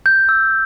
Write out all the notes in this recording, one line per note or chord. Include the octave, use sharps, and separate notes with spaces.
G6
E6